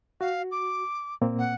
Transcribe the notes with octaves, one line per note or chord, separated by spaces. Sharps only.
F#4 F5
D6
A#2 A#3 C4
F#5